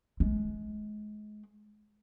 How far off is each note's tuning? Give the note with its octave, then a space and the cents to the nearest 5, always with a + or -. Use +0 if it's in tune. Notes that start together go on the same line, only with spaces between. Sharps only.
G#3 +30